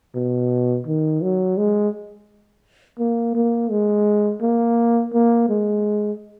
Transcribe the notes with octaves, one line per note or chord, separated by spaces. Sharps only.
B2
D#3
F#3
G#3
A#3
A#3
G#3
A#3
A#3
G#3